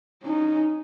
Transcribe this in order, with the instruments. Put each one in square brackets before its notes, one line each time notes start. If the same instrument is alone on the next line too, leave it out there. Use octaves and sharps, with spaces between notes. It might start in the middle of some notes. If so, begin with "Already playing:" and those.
[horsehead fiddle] C#4 D#4